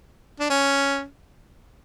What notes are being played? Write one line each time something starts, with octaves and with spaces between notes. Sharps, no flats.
D4
C#4